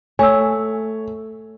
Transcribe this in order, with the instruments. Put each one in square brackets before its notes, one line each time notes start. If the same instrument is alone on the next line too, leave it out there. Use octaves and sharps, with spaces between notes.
[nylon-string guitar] A3 [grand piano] C#5 [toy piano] G#5 E6